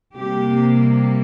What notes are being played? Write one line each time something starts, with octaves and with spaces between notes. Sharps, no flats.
C3 G3 A#3 G4